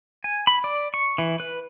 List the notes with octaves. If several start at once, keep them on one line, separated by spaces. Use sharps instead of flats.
G#5
B5
D5
C#6
E3
B4